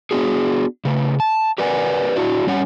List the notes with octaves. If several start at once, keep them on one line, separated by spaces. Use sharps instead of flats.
B3 D4 F#4 G#4
C#3 A3
A5
G4 A#4 B4 D5 F#5 G#5
D4 E4 F#4
G3 C#4 C#5 F#5